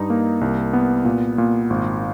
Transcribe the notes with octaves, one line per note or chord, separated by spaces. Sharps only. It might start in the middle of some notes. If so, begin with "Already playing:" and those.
Already playing: G2 D#4
A#3
C2
B3
A#2
A#2
G#1